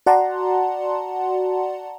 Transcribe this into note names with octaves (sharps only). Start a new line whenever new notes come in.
F#4 D5 F#5 A5 A#5 C6